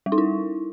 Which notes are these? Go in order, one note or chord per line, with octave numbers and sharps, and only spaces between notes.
G3
D#4
E4